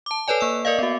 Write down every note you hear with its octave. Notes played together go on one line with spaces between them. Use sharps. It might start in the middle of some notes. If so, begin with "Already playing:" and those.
A5 D6
A4 B4 C#5 D5 G#5
A#3 E6
A#4 D5 D#5 F5
B3 F#4